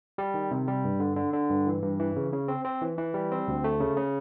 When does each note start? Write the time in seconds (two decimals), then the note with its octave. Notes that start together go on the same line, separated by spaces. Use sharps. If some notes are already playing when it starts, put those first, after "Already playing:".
0.18 G3
0.34 D#3
0.51 C3
0.68 G3
0.84 G2
1.00 D3
1.16 D3
1.33 D3
1.50 G2
1.67 E3
1.83 G2
2.00 E3
2.16 C#3
2.33 C#3
2.48 C4
2.65 C4
2.82 E3
2.98 E3
3.14 G3
3.32 C4
3.48 D2
3.64 A3
3.80 C#3
3.97 C#3